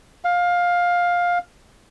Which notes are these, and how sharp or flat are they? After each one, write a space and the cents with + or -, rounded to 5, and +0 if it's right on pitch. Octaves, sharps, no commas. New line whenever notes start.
F5 +15